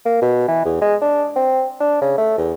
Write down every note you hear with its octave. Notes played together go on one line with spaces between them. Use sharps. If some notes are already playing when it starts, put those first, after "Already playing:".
A#3
B2
E3
E2
G#3
D4
C4
D4
C#3
A3
E2